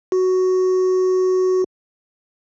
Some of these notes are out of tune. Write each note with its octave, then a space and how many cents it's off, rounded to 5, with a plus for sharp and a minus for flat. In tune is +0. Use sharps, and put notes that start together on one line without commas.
F#4 +5